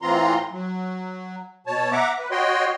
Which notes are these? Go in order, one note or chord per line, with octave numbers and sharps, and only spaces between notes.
A2 E3 C4 F4 A#5 C6
F#3
B2 C#5 A5
E5 F#5 A#5 D6
B4
F#4 C#5 D#5 G5 C6